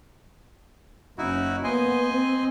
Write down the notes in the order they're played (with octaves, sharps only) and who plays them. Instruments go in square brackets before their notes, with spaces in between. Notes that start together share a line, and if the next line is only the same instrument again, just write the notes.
[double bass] F#1 C#4 [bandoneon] D#4 E4 F#4
[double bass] A#3 B3 [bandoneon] C5 D#5 G#5
[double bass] C4